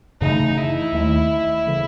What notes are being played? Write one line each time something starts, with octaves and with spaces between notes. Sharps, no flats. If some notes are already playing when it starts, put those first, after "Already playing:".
F#2 C#3 E3 A3 D#4
E4
D#2 D#3 A3
C#3 E3